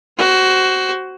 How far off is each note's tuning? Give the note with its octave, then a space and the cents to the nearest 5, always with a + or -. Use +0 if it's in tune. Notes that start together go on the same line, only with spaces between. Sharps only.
F#4 +15 C5 +10